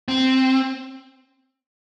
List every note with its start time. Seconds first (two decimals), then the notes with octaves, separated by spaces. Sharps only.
0.08 C4